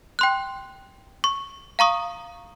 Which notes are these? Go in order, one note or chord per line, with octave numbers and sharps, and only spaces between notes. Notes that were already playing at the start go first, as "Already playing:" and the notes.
G5 C6 F#6
C#6
F5 A#5 C#6 D#6